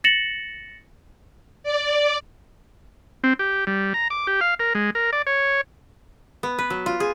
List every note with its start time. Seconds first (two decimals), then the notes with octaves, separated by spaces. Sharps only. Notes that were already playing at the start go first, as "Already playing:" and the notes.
0.04 A6 A#6 C#7 E7 F#7
1.63 D5
3.24 C4
3.39 G4
3.67 G3
3.94 A#5
4.10 D6
4.27 G4
4.41 F5
4.60 A#4
4.75 G#3
4.95 A#4
5.13 D5
5.27 C#5
6.43 B3
6.59 B4
6.70 F#3
6.86 F4
7.00 G#4